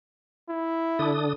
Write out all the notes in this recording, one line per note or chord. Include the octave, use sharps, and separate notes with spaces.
E4
D3 D4 D#6